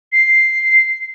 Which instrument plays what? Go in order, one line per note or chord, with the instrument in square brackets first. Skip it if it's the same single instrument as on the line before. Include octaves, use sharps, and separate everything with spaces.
[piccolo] C7